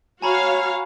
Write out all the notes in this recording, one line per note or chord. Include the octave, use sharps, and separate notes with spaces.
F#4 C#5 F5 G#5 A#5 B5